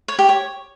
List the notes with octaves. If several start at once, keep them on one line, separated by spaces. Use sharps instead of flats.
C#5
G4
C#5